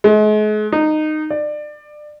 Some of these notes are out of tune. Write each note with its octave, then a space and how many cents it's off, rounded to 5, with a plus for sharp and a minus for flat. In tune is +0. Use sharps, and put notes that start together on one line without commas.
G#3 +40
D#4 -15
D5 +25